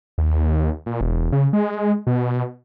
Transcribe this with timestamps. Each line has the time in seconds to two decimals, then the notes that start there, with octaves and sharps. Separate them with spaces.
0.18 D#2
0.86 A#2
1.01 E1
1.32 C#3
1.53 G#3
2.07 B2